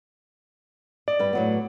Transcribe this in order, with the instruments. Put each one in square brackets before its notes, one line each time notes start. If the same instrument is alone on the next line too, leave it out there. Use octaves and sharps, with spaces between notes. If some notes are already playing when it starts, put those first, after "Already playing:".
[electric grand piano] D5 [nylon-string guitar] D#5
[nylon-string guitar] G2 B4
A2 F#3 B3